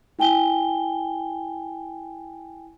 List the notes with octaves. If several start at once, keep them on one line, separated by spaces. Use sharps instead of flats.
E4 G5 G#5 G7